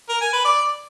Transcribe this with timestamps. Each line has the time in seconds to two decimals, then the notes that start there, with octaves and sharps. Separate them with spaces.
0.09 A#4
0.21 G#5
0.33 B4
0.45 D5